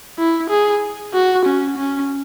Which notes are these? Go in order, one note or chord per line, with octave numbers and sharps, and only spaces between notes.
E4
G#4
F#4
C#4
C#4